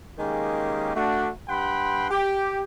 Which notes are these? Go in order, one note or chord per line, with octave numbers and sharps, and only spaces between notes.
D#3 G#3 A#3 C#4 G4 G#4
A3 D4 F#4
G2 F#5 G5 B5 C6
G4